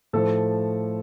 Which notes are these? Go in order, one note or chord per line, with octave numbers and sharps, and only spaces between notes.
A2 F3 A4